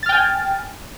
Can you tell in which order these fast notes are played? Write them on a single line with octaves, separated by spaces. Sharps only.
A6 F6 G5 G#5